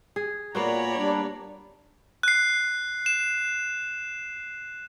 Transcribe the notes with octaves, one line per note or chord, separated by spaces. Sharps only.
G#4
A#2 A#3 B3 F#4 C#5 D5 A#5 B5
G3 D4
F#6 C7
E7